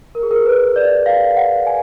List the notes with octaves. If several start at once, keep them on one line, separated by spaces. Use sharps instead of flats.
A#4
G#4
A#4
B4
D5
F5
F#5
G#5